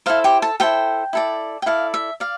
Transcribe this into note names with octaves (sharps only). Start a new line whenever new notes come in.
E4 A4 C5 F5
G4 G5
A4 A5
E4 G4 A4 C5 G5
E4 A4 D5
G5
E4 A4 D5 F5
E5
D5 F5